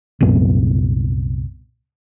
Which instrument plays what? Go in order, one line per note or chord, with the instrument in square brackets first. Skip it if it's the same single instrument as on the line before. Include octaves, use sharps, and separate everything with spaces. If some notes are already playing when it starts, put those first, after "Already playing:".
[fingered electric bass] C2 F#2 A#2 B3